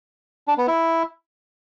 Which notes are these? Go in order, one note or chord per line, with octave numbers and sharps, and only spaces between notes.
D4
B3
E4